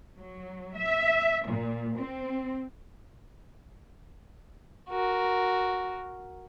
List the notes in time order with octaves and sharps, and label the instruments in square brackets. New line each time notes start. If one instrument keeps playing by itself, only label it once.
[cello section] F#3
E5
A#2
C4
[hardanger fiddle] F#4 A#4